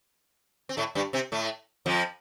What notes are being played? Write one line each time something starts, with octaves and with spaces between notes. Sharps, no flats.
C4
A2 A3
G2 G3
C3 C4
A2 A3
F2 F3